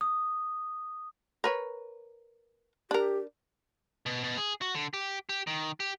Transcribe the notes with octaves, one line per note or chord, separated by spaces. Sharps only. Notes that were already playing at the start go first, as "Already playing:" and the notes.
D#6
A#4 B4 C#5
D4 G4 A#4
B2
B2
G#4
F#4
D3
G4
G4
D#3
G4